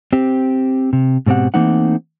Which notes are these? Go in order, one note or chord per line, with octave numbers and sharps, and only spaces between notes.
C4 G4
C3
G#2 B2 C4 G4 F#5
E3 A3 A#3 C4 D#4 F#5